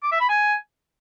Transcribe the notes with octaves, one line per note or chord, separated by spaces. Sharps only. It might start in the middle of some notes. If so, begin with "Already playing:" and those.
D6
E5
B5
G#5